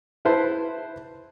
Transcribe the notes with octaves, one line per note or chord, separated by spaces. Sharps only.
E4 B4 C5 A5